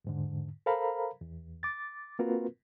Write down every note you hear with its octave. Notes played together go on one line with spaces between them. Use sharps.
E2 G#2 D3
A4 A#4 C5 F5 A#5 B5
E2
D6 A6
A#3 C4 F4 F#4 A#4 B4